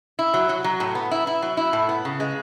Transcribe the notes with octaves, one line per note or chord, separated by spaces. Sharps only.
E4
F#3
F#3
F#3
A2
B3
E4
E4
F#3
E4
A2
B3
C#3
G#3